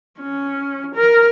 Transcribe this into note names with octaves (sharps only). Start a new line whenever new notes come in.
C#4
A#4